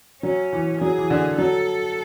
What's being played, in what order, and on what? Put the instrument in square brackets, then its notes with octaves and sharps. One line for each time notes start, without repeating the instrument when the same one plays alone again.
[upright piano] F#3 [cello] C#4
[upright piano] E3
[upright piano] F#3 [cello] G#4
[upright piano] E3
D3
[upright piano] F#3 [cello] A4